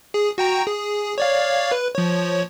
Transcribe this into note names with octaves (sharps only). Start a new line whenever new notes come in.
G#4
F#4 G5 A#5
G#4
C#5 D5 F5
B4
F3 C#5